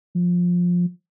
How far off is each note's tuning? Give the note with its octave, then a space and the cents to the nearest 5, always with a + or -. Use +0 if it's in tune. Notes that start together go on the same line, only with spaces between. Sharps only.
F3 +15